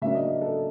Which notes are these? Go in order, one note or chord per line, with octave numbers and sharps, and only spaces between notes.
C#3 F#3 A#3 D4 E5
D#5
A4